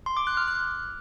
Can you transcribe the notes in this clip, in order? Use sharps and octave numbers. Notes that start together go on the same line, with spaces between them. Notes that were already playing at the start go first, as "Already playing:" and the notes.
C6
D6
F#6
F6
F#6